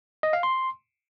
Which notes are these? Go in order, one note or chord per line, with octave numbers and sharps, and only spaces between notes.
D#5
F5
C6